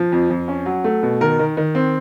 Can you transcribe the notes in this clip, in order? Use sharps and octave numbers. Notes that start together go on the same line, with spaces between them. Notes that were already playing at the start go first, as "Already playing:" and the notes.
Already playing: F3
F2
F2
C#4
F#3
A3
B2
D#3 A#4
D#3
D#3
C4